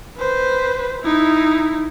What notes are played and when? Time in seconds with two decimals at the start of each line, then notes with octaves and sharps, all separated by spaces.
0.18 B4 C5
1.02 D#4 E4